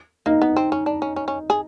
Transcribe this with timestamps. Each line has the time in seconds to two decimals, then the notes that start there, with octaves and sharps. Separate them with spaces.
0.26 A#3 D#4
0.42 B3
0.56 C4
0.72 C#4
0.86 D4
1.02 C#4
1.16 C#4
1.28 C#4
1.50 G#4